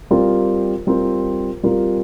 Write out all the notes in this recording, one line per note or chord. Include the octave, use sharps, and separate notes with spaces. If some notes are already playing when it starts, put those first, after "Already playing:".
G3 C4 F4 A#4
G3 C4 F4 A#4
G3 C4 F4 A#4